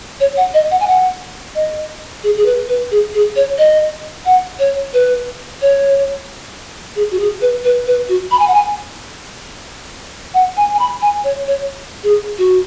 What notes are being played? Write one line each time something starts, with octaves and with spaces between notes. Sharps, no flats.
C#5
F#5
D#5
F#5
G#5
F#5
D#5
G#4
G#4
B4
B4
G#4
G#4
C#5
D#5
F#5
C#5
B4
C#5
G#4
F#4
G#4
B4
B4
B4
F#4
B5
G#5
F#5
G#5
F#5
G#5
G#5
B5
G#5
C#5
C#5
G#4
F#4